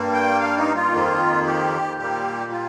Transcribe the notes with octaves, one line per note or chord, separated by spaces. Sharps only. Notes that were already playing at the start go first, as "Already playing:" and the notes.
Already playing: G2 G3 A#3
G5
F5
D#4
F4
F2 D#3 A#3
G4
A#2 G3 A#3 G4
F4